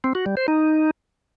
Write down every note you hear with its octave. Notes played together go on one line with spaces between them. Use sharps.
C4
F#4
G3
C5
D#4